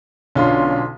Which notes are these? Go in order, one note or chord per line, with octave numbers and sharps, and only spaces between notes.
B1 D3 C#4 D4 F4 C6